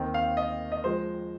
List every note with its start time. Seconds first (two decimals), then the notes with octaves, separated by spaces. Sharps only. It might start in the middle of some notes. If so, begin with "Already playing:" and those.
Already playing: D#2 D#3 C4
0.14 F5
0.37 D#5
0.72 D#5
0.84 F3 G#3 C5